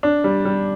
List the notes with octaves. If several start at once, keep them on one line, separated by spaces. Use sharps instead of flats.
D4
G3
G3